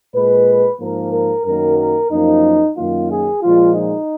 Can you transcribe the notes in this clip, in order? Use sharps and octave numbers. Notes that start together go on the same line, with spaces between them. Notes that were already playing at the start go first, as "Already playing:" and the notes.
A#2 G#3 B4
G#2 F3 A#3 A#4
A#4
F#2 D#3 F#3 A#3 A#4
A#4
F#2 F3 A#3 D#4
F#2 D#3 F#3 A#3 F4
G#4
A#2 F3 G#3 F4
D#4